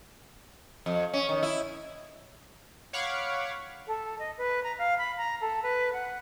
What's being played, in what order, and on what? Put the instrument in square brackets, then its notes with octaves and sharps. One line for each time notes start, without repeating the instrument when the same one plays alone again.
[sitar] F2
C#4
D#3
E4
[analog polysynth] C#5 F5 F#5 B5 C#6 D6
[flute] A4
D#5
B4
A#5
F5
B5
A#5
A4
B4
F#5